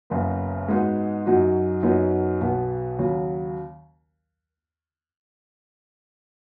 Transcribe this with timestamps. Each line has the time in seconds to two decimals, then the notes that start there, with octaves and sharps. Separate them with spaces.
0.10 F#1 F#2 C#3 B3
0.68 G#2 G#3 B3 D#4 F#4
1.26 F#2 F#3 D#4 F#4
1.83 F#2 F#3 B3 D#4
2.41 B1 B2 B3
2.98 D#2 C#3 F#3